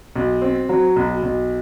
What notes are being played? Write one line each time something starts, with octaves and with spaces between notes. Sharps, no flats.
B1
C4
F#3
B1
B1